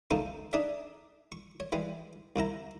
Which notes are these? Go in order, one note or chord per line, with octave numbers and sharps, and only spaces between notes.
C#2 C3 A#3 D#4 A4
D4 D#4 G#4 D5 E5
C#6
C#5
E3 G3 G#3
C2 C3 E4 A#5